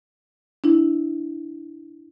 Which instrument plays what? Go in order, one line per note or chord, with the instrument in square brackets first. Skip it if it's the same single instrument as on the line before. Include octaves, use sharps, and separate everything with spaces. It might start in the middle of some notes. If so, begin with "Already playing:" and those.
[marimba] D4 E4